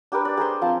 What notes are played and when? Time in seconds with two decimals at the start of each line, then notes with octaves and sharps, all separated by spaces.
0.12 D4 G4 A#4 B4
0.25 D5
0.37 G#4 A#4 C5 C6
0.61 F3 C4 F5 A5